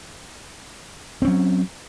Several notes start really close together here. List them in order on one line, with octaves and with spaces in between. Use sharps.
C4 C#4 F#3